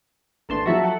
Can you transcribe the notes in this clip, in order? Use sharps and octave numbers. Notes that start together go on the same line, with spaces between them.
G#1 A3 D4 B4 A5 C6
F3 F#3 F#4 E5 A5
A4 F#5